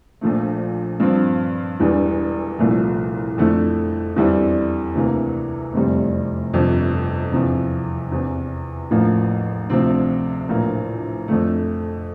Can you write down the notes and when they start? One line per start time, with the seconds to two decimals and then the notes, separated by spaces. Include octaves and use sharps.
0.21 A#1 A#2 F3 A3
1.00 G2 F3 C4
1.80 E1 E2 E3 G3 D4
2.58 C2 A#2 F3 A3
3.38 F2 D3 A3 E4
4.16 E2 D3 G3 C4 E4
4.95 D2 C3 E3 A#3
5.74 F1 E2 C3 G3
6.53 G1 F2 C3
7.32 E2 C3 F3
8.12 E2 C3 E3
8.91 A1 A2 F3 A#3
9.70 D2 C3 F3 C4
10.49 A#1 A2 E3 A#3
11.28 F2 D3 A3